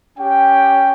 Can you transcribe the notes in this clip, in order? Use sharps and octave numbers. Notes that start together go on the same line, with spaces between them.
C#4 G4 G5